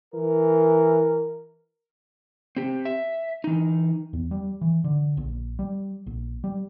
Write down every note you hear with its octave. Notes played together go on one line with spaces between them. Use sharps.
E3 A#4
C4 G4
E5
E3 D#4
E2
G3
E3
D3
A#1
G3
A#1
G3